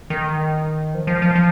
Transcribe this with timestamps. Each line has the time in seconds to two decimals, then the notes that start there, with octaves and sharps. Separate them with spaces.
0.10 D#3
0.94 F3
1.07 F3
1.22 F3
1.35 F3